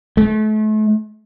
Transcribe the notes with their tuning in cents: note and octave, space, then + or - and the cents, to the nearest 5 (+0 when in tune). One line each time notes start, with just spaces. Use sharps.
A3 -35